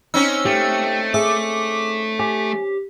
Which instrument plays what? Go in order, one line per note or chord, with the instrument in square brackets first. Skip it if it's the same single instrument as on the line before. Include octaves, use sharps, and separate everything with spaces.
[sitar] C4 C#4 D#4 [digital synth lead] E6
[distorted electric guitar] A3 [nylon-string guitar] G4
[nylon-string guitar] G#4 E5 [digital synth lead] D6
[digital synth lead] G4 [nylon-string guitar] G#5